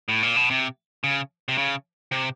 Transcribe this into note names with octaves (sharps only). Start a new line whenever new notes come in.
A2
A#2
B2
C3
C#3
C3
C#3
C3